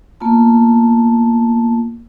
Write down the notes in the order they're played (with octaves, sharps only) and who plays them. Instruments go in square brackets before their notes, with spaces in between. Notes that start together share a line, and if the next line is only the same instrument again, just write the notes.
[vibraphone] A#3 B3 F4 A5